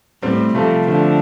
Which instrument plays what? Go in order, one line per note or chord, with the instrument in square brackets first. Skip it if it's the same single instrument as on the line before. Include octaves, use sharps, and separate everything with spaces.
[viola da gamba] A2 [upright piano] G3 C4
[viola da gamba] C3 [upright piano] F3 A3
[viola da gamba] D3 [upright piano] F3 A3